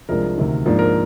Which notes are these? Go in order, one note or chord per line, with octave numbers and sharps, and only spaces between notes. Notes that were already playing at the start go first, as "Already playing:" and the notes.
C2 C3 F3 G#3 D4 A#4
D2 C3 D#3
G#2 F3 A#3 D4
A#4